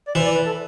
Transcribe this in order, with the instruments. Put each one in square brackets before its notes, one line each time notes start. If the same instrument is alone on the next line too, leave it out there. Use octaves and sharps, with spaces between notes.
[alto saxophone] D5
[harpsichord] E3 E4 [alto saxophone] C5
[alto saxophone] D5
B4
A4